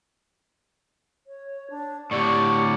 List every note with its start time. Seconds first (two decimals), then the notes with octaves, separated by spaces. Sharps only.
1.27 C#5
1.70 D4
2.11 A2 D3 G4 D5 C#6